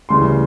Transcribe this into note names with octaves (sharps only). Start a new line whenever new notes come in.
D2 C#3 E3 G3 C6